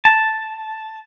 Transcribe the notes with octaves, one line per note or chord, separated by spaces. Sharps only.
A5